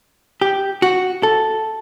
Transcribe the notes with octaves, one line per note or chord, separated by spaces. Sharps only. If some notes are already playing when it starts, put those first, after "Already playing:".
G4
F#4
A4